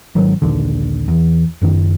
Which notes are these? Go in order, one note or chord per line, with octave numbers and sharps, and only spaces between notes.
G#1 D#3 F#3
A#1 D#2 D3
E2
F#1 F#2 D#3